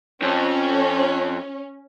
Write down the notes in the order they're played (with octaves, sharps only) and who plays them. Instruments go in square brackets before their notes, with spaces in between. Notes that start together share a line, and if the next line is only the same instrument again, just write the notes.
[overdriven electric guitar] F2 [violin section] C#4